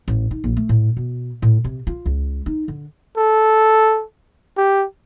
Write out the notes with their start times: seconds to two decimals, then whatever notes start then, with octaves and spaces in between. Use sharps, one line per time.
0.08 A1
0.31 D#4
0.44 A#1
0.57 A3
0.69 A2
0.97 B2
1.42 A2
1.64 C3
1.87 F4
2.06 C#2
2.46 D#4
2.68 D3
3.17 A4
4.57 G4